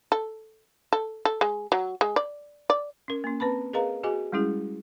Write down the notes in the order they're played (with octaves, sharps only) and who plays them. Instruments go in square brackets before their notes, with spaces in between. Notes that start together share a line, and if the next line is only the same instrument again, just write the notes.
[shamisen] A4
A4
A4
G#3
F#3
G#3
D5
D5
[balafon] C#4 A#4
A#3 C#4
C4 B4 A5 B5
G#4 A#4 B4 D#5 F5 A#5
F#4 G#4 D#5 G#5 D6
G3 G#3 C#4 E4 G#4